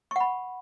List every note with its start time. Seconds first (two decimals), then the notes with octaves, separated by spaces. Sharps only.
0.11 C#6
0.16 F#5
0.20 B5